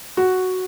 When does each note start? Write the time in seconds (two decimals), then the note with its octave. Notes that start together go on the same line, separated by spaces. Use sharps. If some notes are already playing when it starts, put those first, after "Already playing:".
0.17 F#4